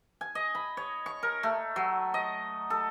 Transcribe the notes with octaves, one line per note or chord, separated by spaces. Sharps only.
G#5
D#5
B5
C#5
C#6
A#4
A3
F#3
D#5
A4